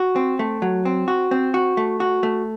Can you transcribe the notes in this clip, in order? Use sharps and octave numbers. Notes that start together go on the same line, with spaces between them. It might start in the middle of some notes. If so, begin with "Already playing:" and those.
Already playing: F#4
C4
A3
F#3
C4
F#4
C4
F#4
A3
F#4
A3